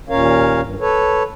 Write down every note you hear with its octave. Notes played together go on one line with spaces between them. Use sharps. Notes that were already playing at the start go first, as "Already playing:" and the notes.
D#2 A#2 C#4 A#4 C#5 F5
G2
A4 B4 C#5